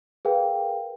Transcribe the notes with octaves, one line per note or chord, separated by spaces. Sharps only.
G#4 A#4 B4 F5 G5